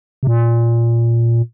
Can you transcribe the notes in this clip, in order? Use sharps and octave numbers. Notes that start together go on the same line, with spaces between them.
C3
A#2